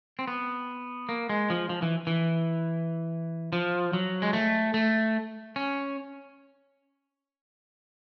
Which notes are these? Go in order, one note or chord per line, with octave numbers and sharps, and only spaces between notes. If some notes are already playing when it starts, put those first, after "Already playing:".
C4
B3
A#3
G#3
F3
F3
E3
E3
F3
F#3
G#3
A3
A3
C#4